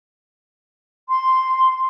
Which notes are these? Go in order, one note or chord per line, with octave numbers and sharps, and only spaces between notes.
C6